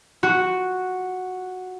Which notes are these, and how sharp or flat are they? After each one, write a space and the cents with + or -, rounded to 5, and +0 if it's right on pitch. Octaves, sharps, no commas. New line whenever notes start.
F#4 -5